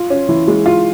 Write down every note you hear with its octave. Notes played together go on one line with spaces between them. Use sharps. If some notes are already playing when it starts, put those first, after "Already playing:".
Already playing: F4
C#4
E3
G#3
F4